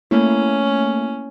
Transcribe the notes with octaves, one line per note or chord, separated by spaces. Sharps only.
A3 A#3 C#4 E4